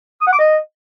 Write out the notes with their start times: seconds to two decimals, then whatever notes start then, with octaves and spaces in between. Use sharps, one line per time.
0.21 D#6
0.27 F#5
0.33 D6
0.38 D#5